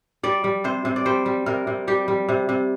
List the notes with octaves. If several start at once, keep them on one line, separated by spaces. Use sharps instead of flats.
G3 D5
G3
C3 C5
C3
D5
G3 C5
G3
C3 A#4
C3
G3 G4
G3
C3
C3